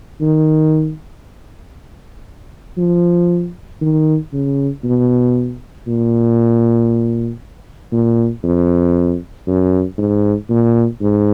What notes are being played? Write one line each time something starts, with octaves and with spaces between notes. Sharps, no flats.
D#3
F3
D#3
C#3
B2
A#2
A#2
F2
F#2
G#2
A#2
G#2